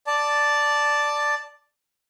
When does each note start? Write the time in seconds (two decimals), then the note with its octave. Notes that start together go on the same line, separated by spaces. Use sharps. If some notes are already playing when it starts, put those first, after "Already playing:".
0.07 D5 A5